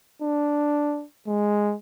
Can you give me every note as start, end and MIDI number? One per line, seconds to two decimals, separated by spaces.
0.22 1.05 62
1.28 1.75 56